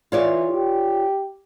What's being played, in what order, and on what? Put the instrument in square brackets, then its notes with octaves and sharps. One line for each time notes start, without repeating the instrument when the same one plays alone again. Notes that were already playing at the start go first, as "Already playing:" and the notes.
[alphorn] E3 [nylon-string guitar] F4 C#5 D5
[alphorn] G4